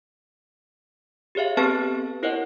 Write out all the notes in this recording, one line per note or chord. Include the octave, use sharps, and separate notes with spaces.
G4 G#4 C#5 E5 F5
B3 C4 G4 A4 B4 A5
E4 A#4 C5 C#5 D#5 F#5